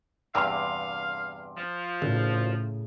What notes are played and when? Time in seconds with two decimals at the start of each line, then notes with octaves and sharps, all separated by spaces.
0.35 E2 G2 C3 F5 C6 D6
1.57 F3
2.02 G#1 A2 C#3